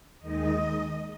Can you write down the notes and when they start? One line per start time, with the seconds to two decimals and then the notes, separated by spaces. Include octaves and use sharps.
0.20 D#2 D#3 G#3 D#4 D#5